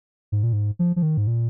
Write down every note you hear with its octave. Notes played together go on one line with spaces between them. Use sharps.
G#2
A#2
G#2
F3
F3
D#3
G#2
A#2